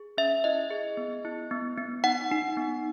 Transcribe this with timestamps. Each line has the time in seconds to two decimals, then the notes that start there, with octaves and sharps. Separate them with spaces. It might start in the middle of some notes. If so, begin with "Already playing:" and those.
Already playing: G#4
0.18 C#4 E5
0.44 E4 D#5
0.70 G#4
0.97 B3
1.25 E4
1.51 B3
1.78 B3
2.04 D#4 F#5
2.32 D#4
2.57 B3